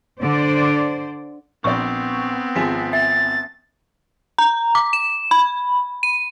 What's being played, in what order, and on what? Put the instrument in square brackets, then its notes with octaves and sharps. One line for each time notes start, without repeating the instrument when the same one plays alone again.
[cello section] D3 C5 D5
[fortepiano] A#1 D5 [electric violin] B3 C4 [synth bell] C#6
[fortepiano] G#1 F3 G#4 [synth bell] G#5 A6 B6
[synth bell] E5 [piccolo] A6
[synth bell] A#5
D6
E7
B5
D#7